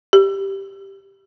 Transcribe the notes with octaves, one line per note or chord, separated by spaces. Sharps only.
G4